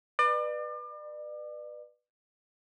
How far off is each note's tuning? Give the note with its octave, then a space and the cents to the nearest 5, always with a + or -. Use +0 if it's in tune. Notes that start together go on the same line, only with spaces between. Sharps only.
B4 -10 D5 +35